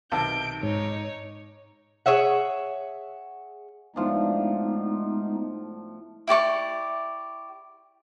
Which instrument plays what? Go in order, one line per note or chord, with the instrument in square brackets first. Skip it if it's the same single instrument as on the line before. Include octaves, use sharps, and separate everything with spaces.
[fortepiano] B1 C3 D#3 [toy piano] F5 A5 E6 [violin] G6 D7
[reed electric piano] G#2 [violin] D#4 C#5
[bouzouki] G#4 C#5 E5 F#5
[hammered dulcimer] A2 F3 D4 [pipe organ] G#3 B3 D#4
[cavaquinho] E4 G4 D5 C#6